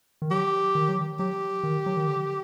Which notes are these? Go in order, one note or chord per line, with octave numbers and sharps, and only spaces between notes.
D#3
F#3 G4
D#3
F#3
D#3
F#3 G4
D#3
F#3
D#3
D3